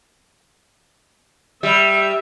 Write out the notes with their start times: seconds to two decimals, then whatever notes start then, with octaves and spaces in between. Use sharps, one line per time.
1.63 G3 E5